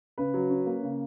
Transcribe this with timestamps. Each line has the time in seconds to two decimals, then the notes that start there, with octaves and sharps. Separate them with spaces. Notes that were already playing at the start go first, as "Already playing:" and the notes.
0.18 C#3 B4
0.34 F#3
0.50 C#4
0.66 A#3
0.83 C#3